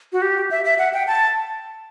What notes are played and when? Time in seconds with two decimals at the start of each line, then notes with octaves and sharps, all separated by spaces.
0.13 F#4
0.22 G4
0.51 E5
0.65 E5
0.79 F#5
0.94 G5
1.07 A5